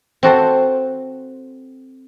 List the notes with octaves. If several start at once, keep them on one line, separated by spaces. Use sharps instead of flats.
C4 F#4 A4 C5